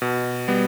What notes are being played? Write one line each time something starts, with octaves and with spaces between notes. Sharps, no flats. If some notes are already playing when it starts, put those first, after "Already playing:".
B2
G3 B3